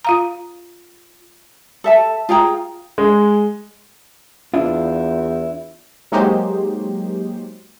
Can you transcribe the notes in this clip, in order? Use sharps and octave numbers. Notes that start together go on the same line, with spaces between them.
F4 F5 A#5
A4 E5 A5
F4 G#4 G5 A#5
G#3
E2 D4 E4 F4
F#3 G#3 A#3 D#4 G4 C5